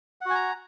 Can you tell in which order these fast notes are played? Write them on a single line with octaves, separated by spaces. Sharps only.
F#5 F#4 G#5 A#5